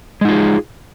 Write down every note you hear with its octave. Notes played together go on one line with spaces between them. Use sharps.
G#3 D#4 F4 G#4